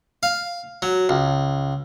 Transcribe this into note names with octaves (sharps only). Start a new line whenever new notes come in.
F5
F#3
C#2